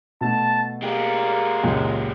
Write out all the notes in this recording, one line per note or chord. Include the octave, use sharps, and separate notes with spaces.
B2 A3 A5
G#3 A#3 G4
C#2 F#2 A#2